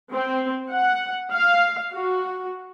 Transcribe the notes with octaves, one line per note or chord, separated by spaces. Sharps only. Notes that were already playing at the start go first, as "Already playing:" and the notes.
C4
F#5
F5
F#4